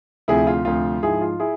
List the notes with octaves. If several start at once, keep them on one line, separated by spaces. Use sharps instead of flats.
D2 C3 F3 E4 G#4
F4
D2 C3 F3 F4
G#2 F3 E4 G#4
F4
E4 G#4